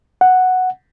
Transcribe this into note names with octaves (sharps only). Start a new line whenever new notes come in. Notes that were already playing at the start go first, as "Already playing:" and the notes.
F#5